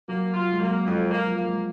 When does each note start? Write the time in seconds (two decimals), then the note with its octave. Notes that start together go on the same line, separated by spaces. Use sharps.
0.08 F#3 A#3
0.34 F#3 F4
0.52 G#3
0.60 F#3 A#3
0.86 F2 G#3
1.11 A#3
1.25 F3
1.37 A#3
1.44 G#3